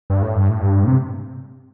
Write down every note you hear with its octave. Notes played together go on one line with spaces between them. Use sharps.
G2
A2
G2
A2
G2
A2
C3